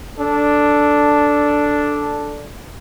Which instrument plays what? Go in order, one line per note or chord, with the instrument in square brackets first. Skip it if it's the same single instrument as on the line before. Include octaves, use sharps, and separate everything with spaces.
[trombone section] D4 A4